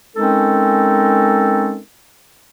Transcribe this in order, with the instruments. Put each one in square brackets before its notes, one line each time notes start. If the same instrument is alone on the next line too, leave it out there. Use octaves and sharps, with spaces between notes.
[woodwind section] G#3 C4 C#4 D#4 A4 A#4